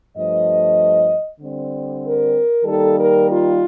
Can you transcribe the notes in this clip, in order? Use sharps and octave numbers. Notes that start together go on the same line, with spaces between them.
G2 F3 A3 D#5
D3 G3 C4
A#4
D#3 G3 A#3 D#4 A4
A#4
F4